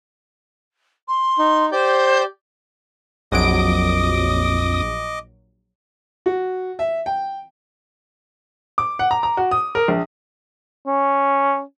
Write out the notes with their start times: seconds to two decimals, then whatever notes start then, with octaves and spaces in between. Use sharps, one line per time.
1.07 C6
1.39 D#4
1.72 G4 C5 D5 G6
3.32 A#1 F2 F#3 D#5 D6 D#6 D7
6.26 F#4
6.79 E5
7.06 G5
8.78 D6
8.99 F#5
9.11 A#5
9.23 A#5
9.37 F#4
9.51 D#6
9.75 A#4
9.88 A#1
10.87 C#4